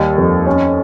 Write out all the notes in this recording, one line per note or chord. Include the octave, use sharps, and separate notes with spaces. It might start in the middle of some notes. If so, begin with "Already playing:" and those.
Already playing: D#2 G3 D#5
F2
C#4